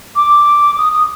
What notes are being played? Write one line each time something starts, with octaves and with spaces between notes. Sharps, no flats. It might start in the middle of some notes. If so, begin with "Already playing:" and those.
D6
D#6
D#6